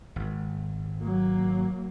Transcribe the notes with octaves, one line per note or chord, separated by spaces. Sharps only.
G#1
F#3 A#3